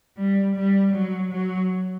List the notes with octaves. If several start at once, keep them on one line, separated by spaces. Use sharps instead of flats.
G3
G3
F#3
F#3